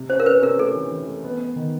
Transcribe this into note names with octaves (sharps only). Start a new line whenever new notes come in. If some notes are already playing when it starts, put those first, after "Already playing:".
Already playing: C3
C#4 C5
A#4
C#4 B4
C3 A#4
A3 A4
E3
E3
A3
B3
B3
D#3